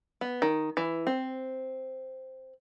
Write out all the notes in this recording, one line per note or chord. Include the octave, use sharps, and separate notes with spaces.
B3
D#3
E3
C4